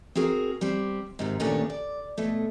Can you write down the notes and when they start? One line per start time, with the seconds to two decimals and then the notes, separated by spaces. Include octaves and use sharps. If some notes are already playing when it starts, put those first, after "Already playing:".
0.15 C4 F#4 G#4 A#4
0.61 G3 C4
1.19 G#2 C3 D#3
1.40 D#2 A#2 A3 B3 C#4 D4
1.70 D5
2.18 B2 A3